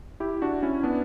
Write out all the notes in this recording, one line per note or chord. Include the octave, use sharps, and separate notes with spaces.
E4 G4
D4 F#4
C#4 E4
B3 D4